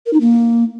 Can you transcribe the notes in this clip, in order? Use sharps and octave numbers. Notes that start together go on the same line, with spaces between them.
A#4
D#4
A#3